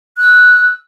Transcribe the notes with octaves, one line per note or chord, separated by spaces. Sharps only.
E6 F#6